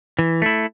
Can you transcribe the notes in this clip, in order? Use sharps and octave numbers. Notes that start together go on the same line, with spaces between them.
E3
A3 E4